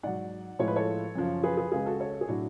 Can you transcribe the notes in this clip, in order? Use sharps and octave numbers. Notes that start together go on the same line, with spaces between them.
G#2 F#3 D5 F#5
A2 F3 G#3 C#5
B4
A4 C#5
F#2 C#3 F3
G#4 B4
G#4 B4
C#2 C#3 G#3 G#4 B4
F#4 A4
A4 C#5
G#4
A2 F#3 D4 F#4